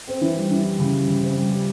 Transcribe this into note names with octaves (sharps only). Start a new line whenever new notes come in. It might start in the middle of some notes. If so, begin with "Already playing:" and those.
C4
E3
G3
E3
G3
C#3
G3
C#3
C4
G3
G3